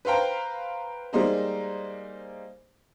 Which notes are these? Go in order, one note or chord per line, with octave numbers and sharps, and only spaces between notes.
B4 C5 F5 G5 A#5
G3 G#3 A#3 D#4 C5